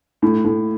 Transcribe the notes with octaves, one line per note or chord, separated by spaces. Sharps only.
A2
A2